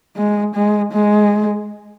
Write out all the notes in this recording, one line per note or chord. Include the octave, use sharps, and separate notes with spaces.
G#3
G#3
G#3